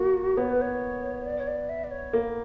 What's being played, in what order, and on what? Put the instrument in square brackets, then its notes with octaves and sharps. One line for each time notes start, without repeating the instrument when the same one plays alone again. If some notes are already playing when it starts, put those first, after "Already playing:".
Already playing: [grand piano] A#3 [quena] F#4
[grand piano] B3 [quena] C#5
[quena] B4
C#5
D5
C#5
D5
E5
D5
C#5
[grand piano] A#3